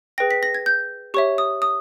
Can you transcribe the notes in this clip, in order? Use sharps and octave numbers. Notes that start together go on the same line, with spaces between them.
G#4 B4 G5 A#6
B6
A#6
G#6
G6
G4 C#5 E5 C#6
D#6
D#6